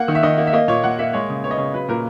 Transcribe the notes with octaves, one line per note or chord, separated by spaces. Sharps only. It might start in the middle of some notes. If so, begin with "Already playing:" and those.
Already playing: A#3 F#5
D#3
E5
D#3 D#5
A#3
E5
A#3 D#5
A#2 C#5
A#2 F#5
A#3 E5
G#3 C#5
C#3
B3 C#5
D#5
C#3 C#5
F#3 B4
A#2 A#4